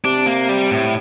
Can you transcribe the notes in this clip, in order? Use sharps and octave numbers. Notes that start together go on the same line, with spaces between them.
C3 D4
A#3
G3
A2